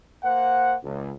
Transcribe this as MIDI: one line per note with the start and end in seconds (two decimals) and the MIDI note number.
0.23 0.75 58
0.23 0.75 72
0.23 0.75 78
0.84 1.13 37